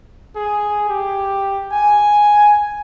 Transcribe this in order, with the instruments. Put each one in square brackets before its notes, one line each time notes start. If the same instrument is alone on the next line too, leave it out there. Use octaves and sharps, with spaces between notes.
[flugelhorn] G#4
G4
G#5